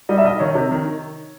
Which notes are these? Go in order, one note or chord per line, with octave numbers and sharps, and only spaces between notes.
G3 D#5
E5
B1 D#5
D#3 C#5
C3
D#3